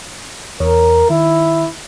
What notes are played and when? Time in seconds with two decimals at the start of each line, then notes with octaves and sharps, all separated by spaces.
0.60 E2 A#4 C#5
1.10 D#3 E4